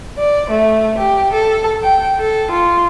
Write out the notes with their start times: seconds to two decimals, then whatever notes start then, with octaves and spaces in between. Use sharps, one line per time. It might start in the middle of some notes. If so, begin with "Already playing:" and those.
0.18 D5
0.50 A3
0.98 G4
1.34 A4
1.83 G5
2.20 A4
2.52 F4